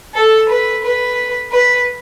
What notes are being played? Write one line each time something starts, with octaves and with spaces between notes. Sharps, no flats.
A4
B4
B4
B4